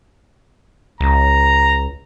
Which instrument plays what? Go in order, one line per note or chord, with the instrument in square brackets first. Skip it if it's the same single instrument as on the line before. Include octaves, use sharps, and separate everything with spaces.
[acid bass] C#2 [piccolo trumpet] A#5